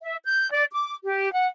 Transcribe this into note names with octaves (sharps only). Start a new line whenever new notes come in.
E5
G6
D5
D6
G4
F#5